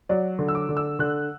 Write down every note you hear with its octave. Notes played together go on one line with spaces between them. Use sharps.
F#3 D5
D3
E6
D6
D3
E6
D3 F#6